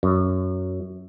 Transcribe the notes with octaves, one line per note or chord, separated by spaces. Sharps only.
F#2